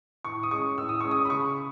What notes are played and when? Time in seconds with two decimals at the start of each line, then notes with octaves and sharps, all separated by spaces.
0.25 A2 C#6
0.43 D#6
0.51 G#3 C#4 C#6
0.78 A2 E6
0.89 D#6
1.01 G#3 C#4 C#6
1.11 D#6
1.25 B5
1.30 C#3 C#6